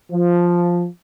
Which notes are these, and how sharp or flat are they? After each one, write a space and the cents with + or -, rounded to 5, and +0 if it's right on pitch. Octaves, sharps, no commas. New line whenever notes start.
F3 +0